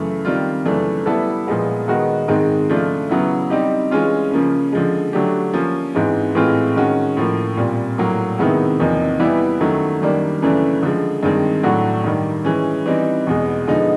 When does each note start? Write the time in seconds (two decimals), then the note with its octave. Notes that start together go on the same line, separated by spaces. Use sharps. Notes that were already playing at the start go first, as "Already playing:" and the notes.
Already playing: F#2 C#3 E3 A3
0.25 D#3 G3 C4 F4
0.65 F#2 C#3 E3 A3 D4
1.06 G3 B3 E4 A4
1.47 A#2 F3 G#3 B3
1.88 D#3 G#3 B3 D#4 F#4
2.28 G#2 D#3 G#3 C4
2.69 C#3 F3 A3 D4 F4
3.09 C#3 F#3 B3 E4
3.50 G3 C4 D#4 G4
3.91 E3 G#3 C#4 F4
4.31 C#3 F3 A#3 C#4
4.72 D3 F3 G#3
5.13 D3 F#3 A3 D4 G4
5.53 F3 A#3 C#4
5.95 G#2 E3 G#3 C4
6.35 A2 E3 G#3 C4 F4
6.76 D#3 G#3 C#4 F#4
7.17 A2 F3 A#3
7.57 A#2 G3 C4
7.98 A2 F#3 A#3
8.38 C3 D#3 G#3 B3 E4
8.80 E2 C3 F3 A#3 D#4
9.19 E3 G3 B3 E4 G4
9.60 F#2 D#3 F#3 A3
10.01 F#2 D#3 G3 A#3 D4
10.42 F#2 C#3 E3 A3 D4
10.83 D3 F3 G#3
11.23 G2 D#3 G#3 C4
11.63 A2 F#3 A3 D4 F#4
12.04 G2 D#3 G3
12.45 E3 G#3 C#4
12.86 E3 G3 C4 D#4
13.27 E2 B2 G#3
13.67 D3 F3 G#3 B3 D#4